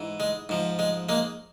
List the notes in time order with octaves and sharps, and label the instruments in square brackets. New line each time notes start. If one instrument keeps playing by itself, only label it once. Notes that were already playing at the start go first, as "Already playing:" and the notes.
Already playing: [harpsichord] G#2 E3
G#3
G#2 F3
G#3
G#3 A#3